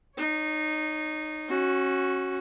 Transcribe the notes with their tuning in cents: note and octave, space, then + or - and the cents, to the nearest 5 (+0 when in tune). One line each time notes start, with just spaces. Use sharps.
D#4 -15 C#5 +15
C#4 -25 F#4 +0